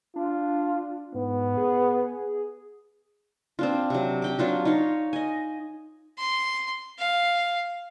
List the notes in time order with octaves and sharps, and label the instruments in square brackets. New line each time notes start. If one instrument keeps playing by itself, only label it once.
[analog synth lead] D4 [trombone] F4
[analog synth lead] G#2 [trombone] B3
[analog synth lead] G#4
[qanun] C4 D4 F4
C3 F#3
G4 G5 D6
F#3 D4 F4 F#4
D#4 F4 C#5 F5
D#5 G#5
[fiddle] C6
F5